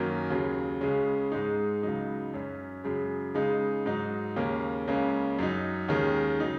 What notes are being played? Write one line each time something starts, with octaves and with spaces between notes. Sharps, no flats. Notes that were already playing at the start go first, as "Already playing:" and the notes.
Already playing: F#2 D#3 A#3 C#4
D#2 C#3 F#3
C#2 C#3 G#3 C#4
G#2 G#3 D#4
C#2 C#3 F#3 D#4
F#2 F#3 C#4
F#2 C#3 G#3
C#2 C#3 G#3 D#4
G#2 F#3 D#4
D#2 C#3 A#3 C#4
C#2 C#3 A#3 C#4
F#2 F#3 D#4
D#2 D#3 G#3 C#4
C#3 F#3 D#4